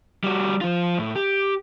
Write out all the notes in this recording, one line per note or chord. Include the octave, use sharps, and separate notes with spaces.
G3 F#4
F3 F4
A2
G4